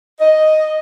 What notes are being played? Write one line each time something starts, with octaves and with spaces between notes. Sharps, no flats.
D#5